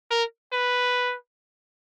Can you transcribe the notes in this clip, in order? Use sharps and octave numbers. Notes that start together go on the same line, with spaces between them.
A#4
B4